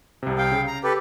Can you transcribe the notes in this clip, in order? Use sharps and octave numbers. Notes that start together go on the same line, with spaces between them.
C2 C3
F5 G5
C#3
A#5
G4 A4 B4